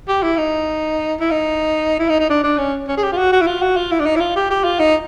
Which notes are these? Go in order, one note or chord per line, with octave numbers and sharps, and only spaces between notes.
G4
E4
D#4
E4
D#4
E4
D#4
D#4
D4
D4
C#4
C#4
G#4
G4
F4
F#4
F#4
E4
F4
F#4
F4
E4
D4
D#4
E4
F4
G4
G4
F4
D#4